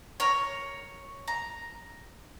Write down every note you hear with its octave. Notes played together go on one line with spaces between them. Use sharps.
A#4 C#5
A#5